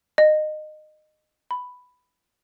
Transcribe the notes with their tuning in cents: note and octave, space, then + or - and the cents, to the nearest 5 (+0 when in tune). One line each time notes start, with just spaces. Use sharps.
D#5 -20
B5 +5